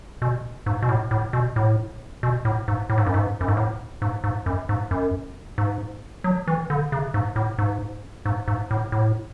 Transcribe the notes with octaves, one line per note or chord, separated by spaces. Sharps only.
B2
G#2
B2
A2
A2
B2
A2
B2
A2
G#2
A2
G#2
F#2
G#2
F#2
G#2
A2
G#2
G#2
F#2
G#2
F#2
G#2
F#3
E3
D3
C#3
G#2
A2
G#2
G#2
G#2
A2
A2